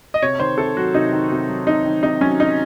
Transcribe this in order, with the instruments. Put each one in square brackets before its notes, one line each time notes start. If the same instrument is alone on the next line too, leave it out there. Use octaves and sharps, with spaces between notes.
[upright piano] D#5
C3 C#5
D#3 C5
C3 A4
F#3 F#4
C3 D#4
D#3
C3
F#3
C3 D#4
D#3
C3 D#4
F#3 C#4
C3 D#4